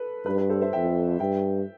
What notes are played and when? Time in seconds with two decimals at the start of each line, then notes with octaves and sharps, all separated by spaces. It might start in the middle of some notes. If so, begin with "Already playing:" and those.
Already playing: A4 B4
0.26 G2 B4
0.38 B4
0.50 A4 C5
0.61 C5 E5
0.73 F2 E5 G5
1.19 G2 E5 G5